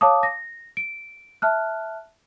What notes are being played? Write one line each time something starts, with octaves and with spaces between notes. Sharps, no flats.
C#5 F5 A5 D6 D#6
A#6
D7
E5 A5 F6 F#6